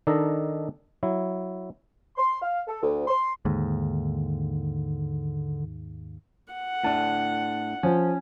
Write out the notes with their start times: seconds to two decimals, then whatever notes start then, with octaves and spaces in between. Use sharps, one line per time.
0.07 D#3 D4 A4 D#5 A#5
1.03 F#3 E4
2.17 C6
2.42 F5
2.67 A4
2.82 D2
3.08 C6
3.45 D#2 G#2 D3
6.53 F#5
6.84 A2 D4 A5
7.83 F3 C#4